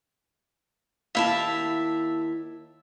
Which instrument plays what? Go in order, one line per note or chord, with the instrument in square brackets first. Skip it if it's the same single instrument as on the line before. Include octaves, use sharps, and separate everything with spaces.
[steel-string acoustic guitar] D#2 E4 A5 [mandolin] G4 E5 F5